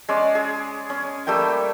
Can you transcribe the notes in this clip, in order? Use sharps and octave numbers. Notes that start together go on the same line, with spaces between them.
G#3 C#4 D5
G#4
C#4
G3 A3 A#3 G5